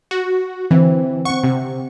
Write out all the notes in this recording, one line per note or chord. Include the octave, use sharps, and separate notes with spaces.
F#4
D3 E3 C4
C4 F#5 C#6
C3